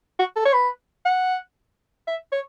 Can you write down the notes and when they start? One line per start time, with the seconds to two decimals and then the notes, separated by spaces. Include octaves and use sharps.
0.19 F#4
0.36 A4
0.45 C#5
0.53 B4
1.05 F#5
2.07 E5
2.32 C#5